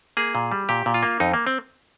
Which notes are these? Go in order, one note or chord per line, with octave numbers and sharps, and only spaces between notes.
A#3 G#4
A#2
G3
A#2 G4
A#2
F4
A#3
F2 D#4
A#3
C4